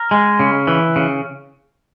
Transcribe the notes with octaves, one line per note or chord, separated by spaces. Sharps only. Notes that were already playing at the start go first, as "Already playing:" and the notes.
Already playing: A#4
G#3
C#3
E3
C#3